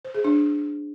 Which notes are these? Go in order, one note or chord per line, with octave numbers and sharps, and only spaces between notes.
C5
G#4
D4